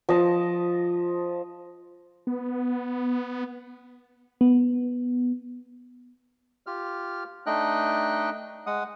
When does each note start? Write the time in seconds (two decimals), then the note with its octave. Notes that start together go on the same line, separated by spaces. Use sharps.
0.09 F3 D#5 A5
2.27 B3
4.41 B3
6.66 F4 G4 F6
7.46 A3 D4 D#4 D#5 G5 F#6
8.66 G#3 F#5 D#6